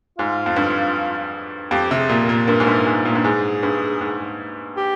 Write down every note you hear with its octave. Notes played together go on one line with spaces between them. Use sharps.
G#2 F4
F2
G2
F2 G4
C3
G#4
A#2
A#4
A#2
G2 A#4
G#2
G2
G#2
A#2
G2
G#2 G#4
G2
G#2
G4